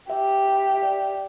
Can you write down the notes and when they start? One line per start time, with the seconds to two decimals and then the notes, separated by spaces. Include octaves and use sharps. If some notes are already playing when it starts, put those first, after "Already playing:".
0.10 G4 E5
0.46 E5
0.74 E5
0.83 D5